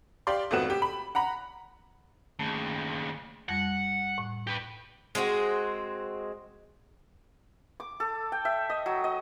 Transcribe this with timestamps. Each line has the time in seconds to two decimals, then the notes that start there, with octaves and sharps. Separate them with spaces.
0.27 G4 D5 F5 C6
0.51 G#1 F2 A3 F#4 B4 E7
0.70 G4
0.82 B5
1.15 F#5 A#5 B5
2.39 D#2 C#3 A3
3.49 F2 G3 F#5
4.18 A2
4.47 G4 B4
5.15 G#3 C4 F4 F#4
7.80 D6
8.00 A4
8.32 G5
8.45 E5
8.70 D#5
8.86 F#3
9.04 D#5